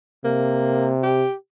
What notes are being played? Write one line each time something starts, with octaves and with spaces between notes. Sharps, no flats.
C3 A#3
G4